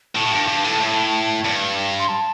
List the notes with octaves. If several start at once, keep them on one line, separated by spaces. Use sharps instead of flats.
A2 A5
A2
G2
G2
A2
A2
G2
C6
A5